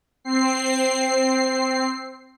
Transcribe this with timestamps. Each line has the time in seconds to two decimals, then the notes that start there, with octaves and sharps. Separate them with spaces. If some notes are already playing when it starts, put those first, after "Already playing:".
0.24 C4 C7